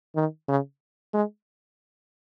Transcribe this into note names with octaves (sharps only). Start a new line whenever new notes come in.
D#3
C#3
G#3